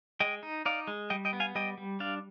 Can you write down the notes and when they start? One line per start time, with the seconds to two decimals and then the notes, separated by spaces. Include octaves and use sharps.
0.20 G#3 D#5 G5
0.43 D#4
0.66 D#4 D5 F5
0.87 G#3
1.10 G3 D#5 G5
1.25 D#5 G5
1.33 B3
1.40 F5 G#5
1.55 G3 D#5 G5
1.78 G3
2.00 D4 D5 F5